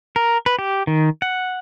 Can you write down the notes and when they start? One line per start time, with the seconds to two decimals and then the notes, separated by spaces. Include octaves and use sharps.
0.16 A#4
0.46 B4
0.59 G4
0.87 D#3
1.22 F#5